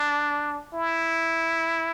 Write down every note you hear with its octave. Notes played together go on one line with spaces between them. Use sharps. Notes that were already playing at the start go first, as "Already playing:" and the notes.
Already playing: D4
E4